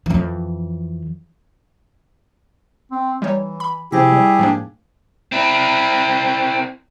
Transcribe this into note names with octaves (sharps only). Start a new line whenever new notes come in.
F2 E3
C4
E3 G3 D#4 C#5
B5
C3 F3 C4 E4 G4 G#4 A#6
G3
G#2 F3 A#3 D4
C4 E4